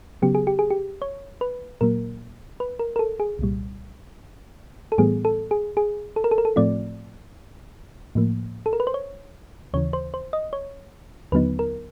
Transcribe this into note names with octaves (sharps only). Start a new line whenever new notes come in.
C#3 F#3 B3 G4
G#4
G4
G#4
G4
C#5
B4
A#2 F#3 A#3 A#4
B4
A#4
A#4
A4
G#4
C2 A#2 G3
A4
A2 E3 G3 B3 G#4
A4
G#4
G#4
A4
A#4
A4
A#4
A4
A2 F3 A3 C4 F4 D5
A2 F3 A#3
A4
A#4
B4
C5
C#5
D#2 C#3 E3 C#5
C5
C5
D#5
C#5
D#2 D3 F#3 B3 D#4 B4
A#4